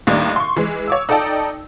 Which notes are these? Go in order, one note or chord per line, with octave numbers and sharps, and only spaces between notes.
D#2 A2 G3 A#3 D4 D#4
C6 C#6
E3 G#3
C#5 D6 E6
D#4 A4 D5 G5 A5